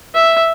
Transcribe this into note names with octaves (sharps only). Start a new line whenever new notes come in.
E5